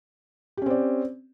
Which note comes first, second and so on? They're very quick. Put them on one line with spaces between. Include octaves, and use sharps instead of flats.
G4 C#4 C4 D5